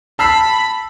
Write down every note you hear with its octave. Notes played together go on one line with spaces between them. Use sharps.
A5 B5 E6 C7